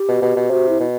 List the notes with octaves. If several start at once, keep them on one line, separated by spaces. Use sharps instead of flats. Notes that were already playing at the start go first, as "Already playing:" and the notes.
Already playing: G4
B2
B2
B2
C3 F#4
E4
B2